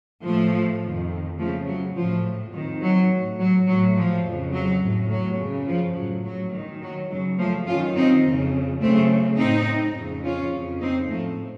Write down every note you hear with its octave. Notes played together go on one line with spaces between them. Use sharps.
A2 F3 A3
F2 D#3
F#2 C#3 F3 A3
F#3
A2 F3
F2 D#3 F#3
F#3
A2
F#3
A2 F#3
F3
F2 C#3
F#3
A2
F#3
F#2 C#3
F3
A2 F#3
F#3
F#2 D#3
F#3
F#2 C#3 F#3
F3 A3
F#2 D#3 C#4 F4
C4 D#4
F2 C#3
F#2 C#3 A3 C4
A2 C4 D#4
F2 C#3
C#4 F4
F2 C#3
C4 D#4
A2 F3 A3